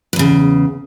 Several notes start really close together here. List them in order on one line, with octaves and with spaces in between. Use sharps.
G2 E2 C#3